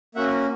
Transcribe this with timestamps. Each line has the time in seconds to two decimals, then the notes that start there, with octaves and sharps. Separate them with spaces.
0.15 A#3 C#4 F#4 E5 F#5